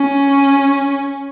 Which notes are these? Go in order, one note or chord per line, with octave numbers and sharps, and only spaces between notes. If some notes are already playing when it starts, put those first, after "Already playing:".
Already playing: C#4